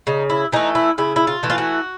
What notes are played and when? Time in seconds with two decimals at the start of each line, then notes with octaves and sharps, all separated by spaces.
0.07 C#3 D#4
0.30 E4
0.52 E3 A3 D#4
0.75 E4
0.98 C#3 E4
1.16 E4
1.27 F4
1.43 E3 A3
1.50 F4
1.58 F#4